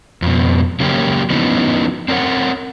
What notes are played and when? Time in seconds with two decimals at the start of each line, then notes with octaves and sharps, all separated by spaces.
0.22 F2 B2
0.80 C#3 F#3 A#3 C#4 G4
1.30 F3 B3 C#4 D#4 E4 F#4
2.08 C4 D4 A#4 C#5 F#5